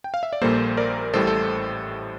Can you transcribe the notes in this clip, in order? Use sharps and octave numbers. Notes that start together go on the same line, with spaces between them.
G5
F5
E5
D5
A#1 A#2 G3 A#3 A4 C5
A#4 D5
A1 A2 G3 A4 C5
A4